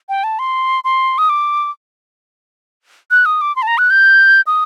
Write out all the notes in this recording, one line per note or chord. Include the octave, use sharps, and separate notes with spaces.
G5
A5
C6
C6
D#6
D6
F#6
D#6
D6
C6
A5
A#5
F#6
G6
D#6